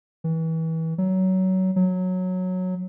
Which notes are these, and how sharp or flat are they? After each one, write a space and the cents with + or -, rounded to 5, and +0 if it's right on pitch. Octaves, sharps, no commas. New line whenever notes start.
E3 -30
F#3 +20
F#3 -10